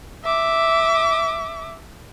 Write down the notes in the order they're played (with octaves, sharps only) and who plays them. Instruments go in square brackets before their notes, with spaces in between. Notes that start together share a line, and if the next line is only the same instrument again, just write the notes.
[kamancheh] E5 D6